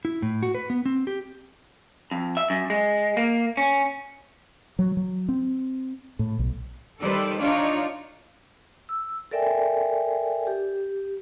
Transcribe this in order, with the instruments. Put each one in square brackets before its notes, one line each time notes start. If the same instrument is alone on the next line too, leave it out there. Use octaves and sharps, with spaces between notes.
[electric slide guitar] E4
A2
F#4
B4
B3
C4
G4
[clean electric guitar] F2
E5
F#2
G#3
A#3
C#4
[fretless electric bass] F#3
F#3
C4
A2
B1
[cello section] D#3 G3 A4 B4 C5 D5
D4 D#4 F4 C#5 D5
[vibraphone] E6
A4 A#4 D5 E5 G5 G#5
G4